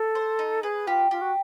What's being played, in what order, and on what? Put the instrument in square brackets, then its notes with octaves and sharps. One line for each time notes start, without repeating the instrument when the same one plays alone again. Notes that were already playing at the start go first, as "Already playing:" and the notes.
Already playing: [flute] A4
[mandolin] C5
D#4
[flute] G#4 [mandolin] B4
[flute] F4 [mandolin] G4
[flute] F4 [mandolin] G4
[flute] F#4